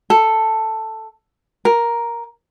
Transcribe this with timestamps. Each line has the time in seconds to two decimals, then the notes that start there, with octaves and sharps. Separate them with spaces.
0.10 A4
1.65 A#4